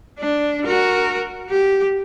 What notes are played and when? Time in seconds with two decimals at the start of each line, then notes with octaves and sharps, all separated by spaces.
0.19 D4
0.65 F#4 A#4
1.50 G4